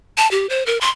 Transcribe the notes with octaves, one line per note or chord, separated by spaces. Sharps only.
A5
G4
C5
A#4
C6